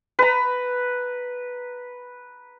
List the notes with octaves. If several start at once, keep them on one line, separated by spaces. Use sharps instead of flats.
B4 A#5